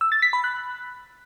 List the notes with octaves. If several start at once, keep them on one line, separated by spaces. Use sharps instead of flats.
E6
A6
B6
B5
F#6